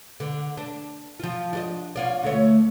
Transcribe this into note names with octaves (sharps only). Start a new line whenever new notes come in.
D3
D4
F3 F4
D4 G4 D#5
C#4 F4 D5
D2 A3 C#5